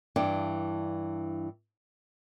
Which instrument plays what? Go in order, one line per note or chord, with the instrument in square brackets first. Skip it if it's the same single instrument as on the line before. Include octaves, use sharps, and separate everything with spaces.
[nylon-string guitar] G2 E3 D4